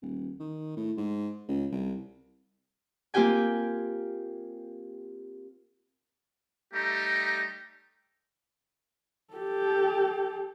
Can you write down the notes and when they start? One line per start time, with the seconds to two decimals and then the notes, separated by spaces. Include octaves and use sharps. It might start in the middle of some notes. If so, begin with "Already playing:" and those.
0.02 D#1
0.40 D#3
0.77 A2
0.97 G#2
1.49 C#2
1.72 C2
3.14 A#3 C4 F4 G4 G5 G#5
6.74 G3 A3 D#4 G4 A#5
9.34 G4 A4